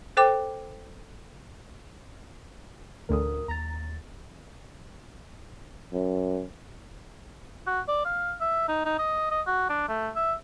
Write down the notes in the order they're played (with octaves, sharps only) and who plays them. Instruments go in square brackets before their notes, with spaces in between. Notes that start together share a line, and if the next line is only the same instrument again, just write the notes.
[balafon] A4 C5 G5 D6
[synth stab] A1 D2 D3 [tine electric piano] A#4 D#6
[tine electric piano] D#2 A6 [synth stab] A#5
[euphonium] F#2
[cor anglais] F#4
D5
F5
E5
D#4
D#4
D#5
D#5
F#4
D4
A3
E5